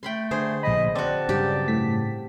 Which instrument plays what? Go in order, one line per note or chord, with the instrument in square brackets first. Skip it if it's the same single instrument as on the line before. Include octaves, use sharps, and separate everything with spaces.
[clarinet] A3 [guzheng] G5 B5 C6
[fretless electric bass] D3 [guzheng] G#4 C5
[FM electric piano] A#1 B5 [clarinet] D#5
[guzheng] C4 F#4 [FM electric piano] D5 [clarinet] A5
[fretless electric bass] G2 C#3 F#3 [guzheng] G4
[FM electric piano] A2 B6